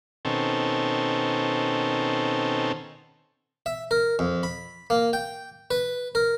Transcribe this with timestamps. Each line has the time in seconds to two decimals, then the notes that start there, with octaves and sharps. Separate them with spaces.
0.25 B2 D#3 C4 C#4 A4
3.66 E5
3.91 A#4
4.19 F2
4.43 B5
4.90 A#3
5.13 G5
5.71 B4
6.15 A#4